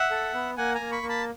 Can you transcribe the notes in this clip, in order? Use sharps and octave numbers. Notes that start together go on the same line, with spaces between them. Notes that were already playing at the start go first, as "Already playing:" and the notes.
Already playing: E5 F#5
A4
B3
A#3 F#5 G#5
G#5 A#5
A#3
B5 C#6
A#3
A5 B5